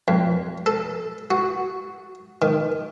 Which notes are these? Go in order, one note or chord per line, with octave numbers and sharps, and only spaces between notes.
F2
A4
F#4
D#3